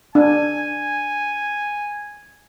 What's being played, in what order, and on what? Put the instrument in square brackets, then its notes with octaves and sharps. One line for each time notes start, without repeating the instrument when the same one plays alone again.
[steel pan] D4 [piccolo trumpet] G#5